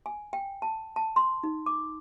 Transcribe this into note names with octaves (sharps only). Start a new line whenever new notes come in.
G#5
G5
A5
A5
C6
D#4
D6